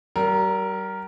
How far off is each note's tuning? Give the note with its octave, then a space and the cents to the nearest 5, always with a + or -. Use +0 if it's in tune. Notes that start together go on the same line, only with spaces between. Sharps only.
G3 -40 A#4 +0